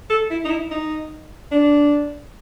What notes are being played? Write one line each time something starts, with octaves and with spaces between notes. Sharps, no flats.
A4
E4
D#4
E4
D#4
D4